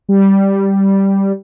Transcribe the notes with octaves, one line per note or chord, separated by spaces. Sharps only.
G3